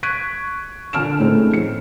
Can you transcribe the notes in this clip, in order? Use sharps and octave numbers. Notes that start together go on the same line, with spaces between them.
C#6 F#6 G#6 B6 D7 D#7
A#2 D3 A5 F6 D7 E7
A2 A3 C4 C#4 D#4 G#4
F2 C#7